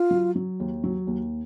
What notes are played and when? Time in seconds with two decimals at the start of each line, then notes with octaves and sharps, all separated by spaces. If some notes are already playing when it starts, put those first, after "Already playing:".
Already playing: F4
0.11 F#3
0.36 F#3
0.60 D#2
0.84 F#3
1.07 D#2